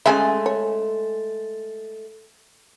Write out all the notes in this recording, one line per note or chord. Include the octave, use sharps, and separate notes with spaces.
G#3 A3 C#4 G#4 E5 G#5
C#5